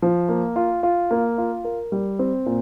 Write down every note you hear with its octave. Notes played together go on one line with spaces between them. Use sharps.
F3
A#3
F4
F4
A#3
F4
A#4
G3
C4
A#2